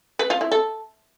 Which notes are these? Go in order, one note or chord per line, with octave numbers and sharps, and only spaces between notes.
B4
F4
E4
A4